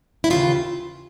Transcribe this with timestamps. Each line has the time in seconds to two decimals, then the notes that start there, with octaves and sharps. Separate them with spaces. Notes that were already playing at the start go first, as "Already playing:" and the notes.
0.24 E4
0.30 D#2 C#3 E3 F4